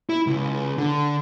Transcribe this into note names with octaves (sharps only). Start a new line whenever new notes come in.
E4
C#2
D3